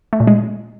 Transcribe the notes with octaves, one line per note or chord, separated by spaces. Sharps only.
A3
A#2
G#3